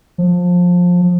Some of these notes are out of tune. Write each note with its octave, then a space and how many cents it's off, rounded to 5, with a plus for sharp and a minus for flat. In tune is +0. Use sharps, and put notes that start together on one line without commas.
F3 +20